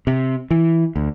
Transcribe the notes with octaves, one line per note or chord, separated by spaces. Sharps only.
C3
E3
D2